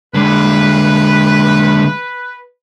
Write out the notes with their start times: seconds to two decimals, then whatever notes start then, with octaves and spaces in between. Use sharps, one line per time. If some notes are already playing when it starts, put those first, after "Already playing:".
0.14 D3 G#3 B4